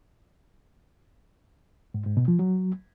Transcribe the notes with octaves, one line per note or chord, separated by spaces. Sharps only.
G#2
G#2
B2
F3
F#3